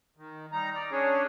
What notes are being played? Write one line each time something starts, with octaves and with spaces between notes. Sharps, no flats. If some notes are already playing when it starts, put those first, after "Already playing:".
D#3
G3 D#4 A#5
D5
C#4 D4 G#4 C#5